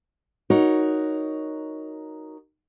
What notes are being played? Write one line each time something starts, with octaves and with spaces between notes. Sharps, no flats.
D#4 F#4 A#4 C#5